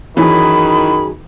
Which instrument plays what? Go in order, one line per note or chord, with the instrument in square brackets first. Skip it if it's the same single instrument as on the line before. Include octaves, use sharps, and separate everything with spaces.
[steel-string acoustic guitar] F#2 G#4 [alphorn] D#3 [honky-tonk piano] E3 [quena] B5